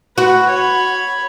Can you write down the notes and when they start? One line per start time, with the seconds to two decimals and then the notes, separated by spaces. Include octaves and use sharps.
0.18 F#4 B4
0.49 C#5 B5